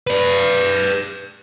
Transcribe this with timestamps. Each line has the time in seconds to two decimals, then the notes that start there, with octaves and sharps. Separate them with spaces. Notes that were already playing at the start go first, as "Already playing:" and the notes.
0.07 B4 D5